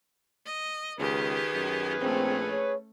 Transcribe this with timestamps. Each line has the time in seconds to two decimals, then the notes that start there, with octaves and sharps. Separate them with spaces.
0.46 D#5
0.99 C#2 D#3 G4 G#4 B4
1.54 F#2
2.01 A#1 A3 C4 C#4
2.51 C#5